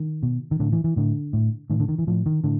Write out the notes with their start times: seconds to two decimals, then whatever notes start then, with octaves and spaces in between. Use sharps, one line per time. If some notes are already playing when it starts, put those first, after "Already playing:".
Already playing: D#3
0.23 B2
0.51 D#3
0.59 A2 D3
0.72 E3
0.84 E3
0.96 A2 D3
1.33 A2
1.70 A2 D#3
1.80 D3
1.88 D#3
1.98 E3
2.07 A2 F3
2.26 D#3
2.44 A2 D3